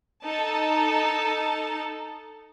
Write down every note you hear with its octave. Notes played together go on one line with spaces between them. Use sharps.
D#4 A4 A5